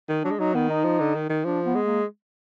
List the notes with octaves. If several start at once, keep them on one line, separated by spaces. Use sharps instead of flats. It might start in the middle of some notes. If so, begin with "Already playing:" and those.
D#3
F#3 D4
G#3
F#3 D#4
D#3 B3
D#4
F3
D3
D#3
D#3
F3 D4
B3
G#3
A#3